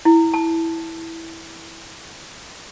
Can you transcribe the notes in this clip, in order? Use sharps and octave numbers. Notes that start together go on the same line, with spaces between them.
E4
A5